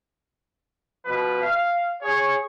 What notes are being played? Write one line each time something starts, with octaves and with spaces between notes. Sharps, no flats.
B2 F3 B4
F5
G#4 C#5